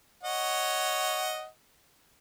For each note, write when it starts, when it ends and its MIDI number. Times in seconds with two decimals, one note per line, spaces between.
0.24 1.46 73
0.24 1.46 75
0.24 1.46 78